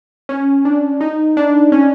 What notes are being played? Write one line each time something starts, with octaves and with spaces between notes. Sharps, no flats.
C#4
D4
D#4
D4
C#4